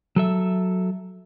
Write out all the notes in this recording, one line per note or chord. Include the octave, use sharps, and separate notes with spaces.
F#3 A4 E5